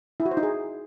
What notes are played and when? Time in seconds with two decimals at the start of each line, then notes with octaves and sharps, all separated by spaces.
0.20 E4
0.25 F#4
0.31 C5
0.37 D#4
0.43 G#4